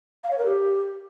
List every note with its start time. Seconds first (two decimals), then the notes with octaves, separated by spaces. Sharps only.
0.23 F5
0.30 C#5
0.37 A#4
0.45 G4